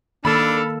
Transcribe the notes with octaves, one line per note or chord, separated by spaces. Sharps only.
D#3 A#3 D4 A4 B5 E6 F6